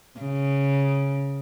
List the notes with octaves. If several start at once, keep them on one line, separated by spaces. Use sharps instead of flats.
C#3